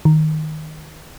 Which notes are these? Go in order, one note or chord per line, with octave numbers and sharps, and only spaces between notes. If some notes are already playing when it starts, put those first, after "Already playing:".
D#3